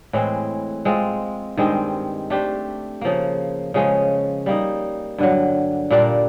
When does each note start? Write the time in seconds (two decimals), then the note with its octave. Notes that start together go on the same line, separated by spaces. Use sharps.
0.13 A2 E3 G#3 C4
0.85 G#3 C4 F4
1.57 G2 D#3 G#3 C4
2.30 A3 D4 G4 C5
3.01 C#3 F3 A#3
3.74 C#3 F3 G#3 C#4
4.46 G3 A#3 D#4
5.18 G2 D3 F#3
5.91 A#2 G3 A#3 D4